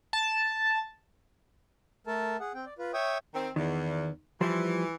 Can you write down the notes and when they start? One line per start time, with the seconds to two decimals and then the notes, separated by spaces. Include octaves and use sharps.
0.13 A5
2.07 A3 A4 A#4 A5
2.40 G#4 F#5
2.54 C4 G5
2.66 D5
2.79 F4 B4
2.94 C#5 E5 G5 C#6 D#6
3.34 D#3 C4
3.56 E2 D#3
4.41 E3 F3 G3 C5